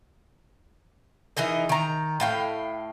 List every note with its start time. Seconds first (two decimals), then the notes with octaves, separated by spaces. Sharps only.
1.37 E3 D#4 G#4 A#4
1.69 D#3 A#5
2.20 A2 F5 G5